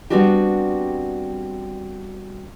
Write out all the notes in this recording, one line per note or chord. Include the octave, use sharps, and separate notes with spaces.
G3 B3 C4 D4 F#4 G4